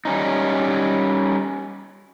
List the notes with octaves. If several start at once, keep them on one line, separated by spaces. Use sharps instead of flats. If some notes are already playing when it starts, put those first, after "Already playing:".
G3 C#4 D#4